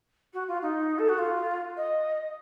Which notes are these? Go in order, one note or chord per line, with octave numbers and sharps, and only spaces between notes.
F#4
F4
D#4
A4
F#4
F4
D#5